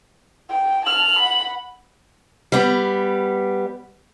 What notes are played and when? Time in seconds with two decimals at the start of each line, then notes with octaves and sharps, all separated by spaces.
0.49 G5
0.86 A5 F6 F#7
1.19 F#5 B5
2.52 G3 B3